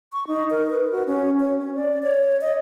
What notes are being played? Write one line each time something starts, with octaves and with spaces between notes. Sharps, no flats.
C#6
D#4
A#4
B4
F#4
C#4
C#5
C#4
D5
C#5
D#5